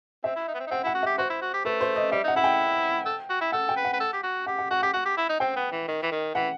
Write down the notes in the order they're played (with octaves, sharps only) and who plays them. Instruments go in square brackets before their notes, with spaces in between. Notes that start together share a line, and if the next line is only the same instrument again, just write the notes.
[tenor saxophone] C4 [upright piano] E5
[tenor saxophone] E4
D#4
B3
C4
D#4
[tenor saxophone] C4 [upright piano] F#5
[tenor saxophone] E4 [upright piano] F#5
[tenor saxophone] F#4
[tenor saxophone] G4 [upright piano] E5
[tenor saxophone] F#4 [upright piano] C5
[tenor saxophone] E4
F#4
G4
[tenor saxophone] A3 [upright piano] B4
[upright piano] C5
D#5
[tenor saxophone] G3 [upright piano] E5
[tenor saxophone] D#4 [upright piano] F#5
[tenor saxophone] E4 [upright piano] F#5
[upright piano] G5
[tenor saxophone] A4
F#4
E4
[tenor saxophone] A4 [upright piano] F#5
[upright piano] G5
[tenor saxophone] B4
[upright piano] F#5
[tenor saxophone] B4
A4
G4
F#4
[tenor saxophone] G4 [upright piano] F#5
[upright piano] F#5
[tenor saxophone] F#4 [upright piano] F#5
[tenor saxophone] G4 [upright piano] F#5
[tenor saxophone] F#4 [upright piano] F#5
[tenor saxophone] G4
E4
D#4
[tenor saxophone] C4 [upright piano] G5
[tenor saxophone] B3
E3
D#3
E3
D#3
[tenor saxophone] E3 [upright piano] F#5